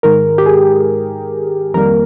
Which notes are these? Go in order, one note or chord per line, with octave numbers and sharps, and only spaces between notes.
G#2 D#3 G#3 A#4
G4
G#4
F2 D#3 G3 A#3 A#4